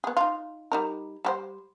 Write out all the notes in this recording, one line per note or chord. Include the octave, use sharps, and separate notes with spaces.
B3 G#4
D#4 F4
G3 D#4 A#4
G3 G4 C5